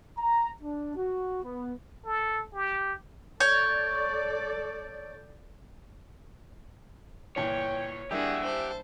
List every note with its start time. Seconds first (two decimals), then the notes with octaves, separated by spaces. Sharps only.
0.18 A#5
0.61 D4
0.96 F#4
1.43 B3
2.05 A4
2.53 G4
3.40 A4 C#5 D5 G6
7.36 G1 A#2 E3 C#5 G5
8.11 G3 A#3 D4 E4 G4 G#4 E5 F#5
8.44 C5 A5